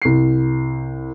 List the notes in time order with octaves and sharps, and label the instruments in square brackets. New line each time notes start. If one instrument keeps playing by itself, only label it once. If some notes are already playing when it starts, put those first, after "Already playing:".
[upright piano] C2 C7